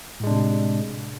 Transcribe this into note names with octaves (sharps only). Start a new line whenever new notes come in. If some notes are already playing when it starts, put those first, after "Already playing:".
A2 C3 G#3 D4